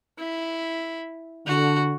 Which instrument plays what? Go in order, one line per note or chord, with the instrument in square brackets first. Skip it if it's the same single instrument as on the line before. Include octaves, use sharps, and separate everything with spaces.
[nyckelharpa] E4
[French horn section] D3 [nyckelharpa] F#4